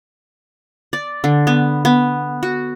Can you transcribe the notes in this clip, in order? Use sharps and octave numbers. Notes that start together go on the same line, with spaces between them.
D5
D3
B3
B3
F#4